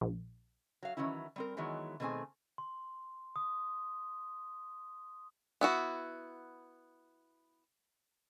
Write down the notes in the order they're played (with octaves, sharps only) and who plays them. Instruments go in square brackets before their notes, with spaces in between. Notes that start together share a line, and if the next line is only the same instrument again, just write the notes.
[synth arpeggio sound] A#1
[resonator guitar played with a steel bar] F#3 F5
D#3 E3 F#3 C#4 E4
G3 C4 A#4
D#3 E3 F#3 G#3 B3
B2 D#3 A3 C4 G#4 G#5
[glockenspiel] C6
D#6
[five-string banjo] B3 E4 F#4